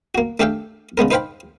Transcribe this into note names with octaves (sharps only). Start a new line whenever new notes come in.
A#3 F#4
A3 D4 G4 A4 F5 G5
C#3 G#3 B3 A#4
D#4 B4 C5 F5 G5 B5